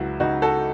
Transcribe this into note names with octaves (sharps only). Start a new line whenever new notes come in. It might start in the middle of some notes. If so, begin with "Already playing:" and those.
Already playing: C#2 F#3 E4 F#4
C#2 D#4 F#4
F#4 A4